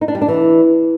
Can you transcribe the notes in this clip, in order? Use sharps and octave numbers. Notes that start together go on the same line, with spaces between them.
D#4
D4
G3
D4
E3